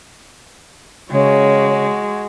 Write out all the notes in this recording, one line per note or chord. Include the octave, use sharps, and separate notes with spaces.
C#3 G#3 F#4